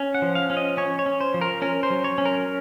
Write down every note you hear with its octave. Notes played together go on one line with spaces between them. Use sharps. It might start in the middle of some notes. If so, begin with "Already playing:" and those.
Already playing: C#4
F#5
F3
F5
C#4
D#5
C#4 C#5
C#5
C#4
C5
F3
A#4
C#4 A#4
C5
F#3
C#5
C#4
A#4